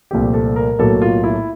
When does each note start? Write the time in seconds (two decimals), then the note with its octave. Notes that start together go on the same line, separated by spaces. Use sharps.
0.11 C2 A#2 F3 A3 C4 G4
0.34 A4
0.56 A#4
0.79 B1 A2 F#3 A#3 A4
1.02 F4
1.24 E4